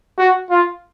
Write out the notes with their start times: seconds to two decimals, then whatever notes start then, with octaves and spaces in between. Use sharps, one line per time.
0.18 F#4
0.50 F4